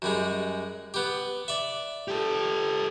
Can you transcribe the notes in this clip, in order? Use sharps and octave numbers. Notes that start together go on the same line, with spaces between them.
F#2 G3 G#3
B3 G4
D5 E5
G4 A4